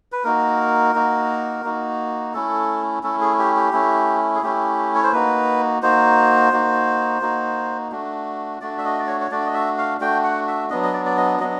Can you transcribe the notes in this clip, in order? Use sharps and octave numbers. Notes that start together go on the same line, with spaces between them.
B4
A#3 D#4 F#4 A#4
A#3 D#4 F#4
A#3 D#4 F#4
A3 C#4 E4 A4
A3 C#4 E4 A4
G#4
G4
G4
A3 C#4 E4
G#4
A3 C#4 E4 G4
C#5
C5
A#3 D#4 F#4 B4
A#3 D#4 F#4 C5
A#3 D#4 F#4
A#3 D#4 F#4
A3 D4 F#4
A3 D4 F#4 D5
E5
D#5
D5
C#5
C#5
A3 D4 F#4 D5
D#5
E5
F5
A3 D4 F#4 G5
F#5
E5
F#3 B3 D4 D#5
D#5
D5
D5
D#5
F#3 B3 D4 D#5